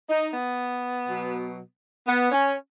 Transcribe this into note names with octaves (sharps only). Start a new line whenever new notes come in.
D#4
B3
B2 F#3
B3
C#4